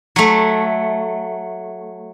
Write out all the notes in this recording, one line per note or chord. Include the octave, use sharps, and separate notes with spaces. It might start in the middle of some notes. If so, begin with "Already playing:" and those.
F#3 A3